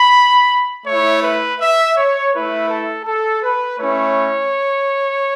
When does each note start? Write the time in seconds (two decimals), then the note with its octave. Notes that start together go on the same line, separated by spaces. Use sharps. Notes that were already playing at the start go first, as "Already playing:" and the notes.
Already playing: B5
0.86 A3 E4 C#5
1.23 B4
1.60 E5
1.96 C#5
2.33 A3 E4 B4
2.70 A4
3.06 A4
3.43 B4
3.79 A3 C#4 E4 C#5